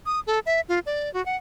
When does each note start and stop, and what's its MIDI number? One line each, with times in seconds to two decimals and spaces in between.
0.06 0.20 87
0.27 0.39 69
0.46 0.61 76
0.69 0.79 65
0.86 1.12 74
1.14 1.24 66
1.26 1.36 78